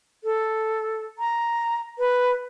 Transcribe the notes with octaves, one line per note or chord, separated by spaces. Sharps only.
A4
A#5
B4